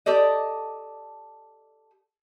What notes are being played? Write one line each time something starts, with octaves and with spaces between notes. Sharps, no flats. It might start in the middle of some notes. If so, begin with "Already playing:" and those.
G4 A4 D5 D#5